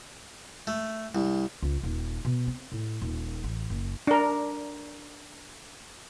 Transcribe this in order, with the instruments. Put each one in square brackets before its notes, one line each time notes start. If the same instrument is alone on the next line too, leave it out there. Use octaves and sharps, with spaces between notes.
[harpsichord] A3
C2
[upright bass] C#2
D#1
B2
C4
A2
D#1
A1
F#1
[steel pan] D4 A#4